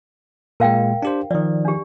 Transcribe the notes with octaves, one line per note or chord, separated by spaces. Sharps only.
A#2 G#3 A#4 F5 G5
D4 G4 C5
D#3 F3 D5
D4 G4